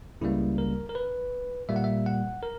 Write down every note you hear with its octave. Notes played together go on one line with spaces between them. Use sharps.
C#2 C#3 G3 A#3 E4
A#4
A#4
B4
A#2 G3 A#3 E5
F#5
E5
F#5
A#4